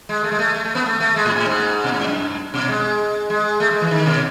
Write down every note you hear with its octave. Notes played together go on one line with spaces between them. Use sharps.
G#3
A3
G#3
A3
A3
A3
B3
A3
A3
G#3
A2
A2
G#2
B2
A2
G#2
F#2
B2
G#3
G#3
A3
G#3
E3
D#3
B2